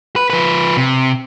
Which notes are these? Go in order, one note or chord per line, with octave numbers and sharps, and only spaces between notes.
B4
F3 B4
C3